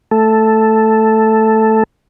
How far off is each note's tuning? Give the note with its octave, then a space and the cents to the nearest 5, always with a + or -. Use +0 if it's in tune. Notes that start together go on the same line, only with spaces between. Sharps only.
A3 +0 A4 +0